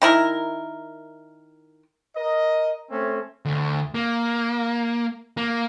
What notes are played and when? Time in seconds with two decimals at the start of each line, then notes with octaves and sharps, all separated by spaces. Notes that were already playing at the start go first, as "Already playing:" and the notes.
0.02 D#3 E4 A#4
2.16 A#4 D#5
2.91 A3 C4 C#4
3.45 D2
3.95 A#3
5.37 A#3